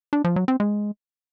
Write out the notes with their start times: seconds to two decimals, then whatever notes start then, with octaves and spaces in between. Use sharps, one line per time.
0.13 D4
0.24 F3
0.36 F#3
0.48 C4
0.60 G#3